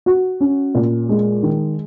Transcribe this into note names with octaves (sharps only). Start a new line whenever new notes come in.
F#4
C#4
A#2
G#3
D#3